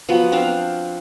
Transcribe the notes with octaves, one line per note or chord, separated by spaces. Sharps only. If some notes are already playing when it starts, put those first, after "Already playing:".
F3 F#3 B3
C4 D4 F5